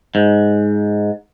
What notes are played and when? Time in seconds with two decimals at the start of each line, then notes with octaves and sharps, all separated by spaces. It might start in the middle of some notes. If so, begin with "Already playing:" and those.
0.15 G#2